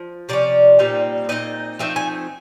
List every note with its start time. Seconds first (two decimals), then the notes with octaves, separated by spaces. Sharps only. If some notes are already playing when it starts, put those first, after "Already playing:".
Already playing: F3
0.29 C3 F3 C#4 D5
0.79 A#2 G3 C4 D#4
1.29 A#2 G3 C4 D#4 D#5
1.79 F3 A3 C4 D#4 E5
1.96 G#5